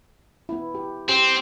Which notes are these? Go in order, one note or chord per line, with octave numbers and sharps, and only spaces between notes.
B3 E4
G4
C4 G4